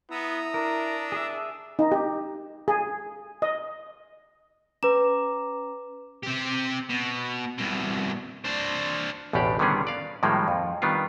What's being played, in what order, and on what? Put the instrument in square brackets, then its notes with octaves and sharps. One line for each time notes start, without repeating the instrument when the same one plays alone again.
[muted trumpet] B3 [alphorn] E4 [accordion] A#5 D#6 E6
[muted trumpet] D4 [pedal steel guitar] A#4
[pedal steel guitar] G#4 E5
[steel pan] D#4
G4
G#4
D#5
[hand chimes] C#4 A#5 D6 [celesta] B4 E7
[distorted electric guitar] C4 G4
B2
C2 B2
D4 C5
[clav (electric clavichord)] A1 E2 B2 D4 G4 D5
D3 D#3 G3 B3 C#4 G#4
D5 F5
A2 D#3 F3 G3 G#3 A#3
F2
D#3 G3 B3 D4 F4